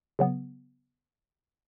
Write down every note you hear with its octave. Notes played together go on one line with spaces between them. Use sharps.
C#3 F#3 B3